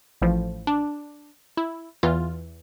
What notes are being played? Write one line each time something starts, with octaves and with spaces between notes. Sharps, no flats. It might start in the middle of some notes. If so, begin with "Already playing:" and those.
A1 A2 F3
D4
E4
E2 E3 F4